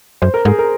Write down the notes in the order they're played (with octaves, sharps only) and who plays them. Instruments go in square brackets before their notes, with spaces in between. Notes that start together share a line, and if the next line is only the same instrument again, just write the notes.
[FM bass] F#2 [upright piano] C5
[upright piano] A#4
[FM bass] G#2 [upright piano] G#4
[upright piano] A#4